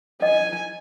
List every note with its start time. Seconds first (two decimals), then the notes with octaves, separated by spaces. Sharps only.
0.22 D#5 G#5